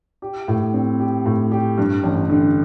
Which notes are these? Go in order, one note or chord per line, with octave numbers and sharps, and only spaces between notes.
G4
A2
C4
G4
A2
G4
G2
A1
D3